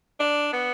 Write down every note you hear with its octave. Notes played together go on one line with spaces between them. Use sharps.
D4
B3